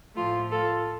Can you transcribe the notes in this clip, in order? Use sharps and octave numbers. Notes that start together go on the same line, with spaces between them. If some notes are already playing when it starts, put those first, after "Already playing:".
A2 F3 A3 F4
F4 A4